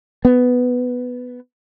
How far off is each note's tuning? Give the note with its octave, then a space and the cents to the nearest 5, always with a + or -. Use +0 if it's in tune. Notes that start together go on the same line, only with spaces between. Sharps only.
B3 +5